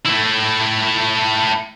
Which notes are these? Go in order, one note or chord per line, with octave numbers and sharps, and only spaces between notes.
A3 E4